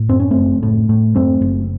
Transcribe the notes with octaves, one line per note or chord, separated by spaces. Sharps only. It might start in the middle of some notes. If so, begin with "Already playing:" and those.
Already playing: A2
F#2 C4
C#4
F#1 A3 C4
A2
A2
F#2 A3 C4
F#1